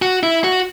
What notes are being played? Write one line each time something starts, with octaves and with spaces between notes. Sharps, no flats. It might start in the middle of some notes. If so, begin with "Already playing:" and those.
F#4
E4
F#4